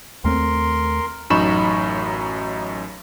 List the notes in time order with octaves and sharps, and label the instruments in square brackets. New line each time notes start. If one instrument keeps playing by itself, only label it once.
[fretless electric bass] D#2 A3 C4 [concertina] A#4 C6
[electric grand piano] A1 F#2 D#4 B5 C#6 E7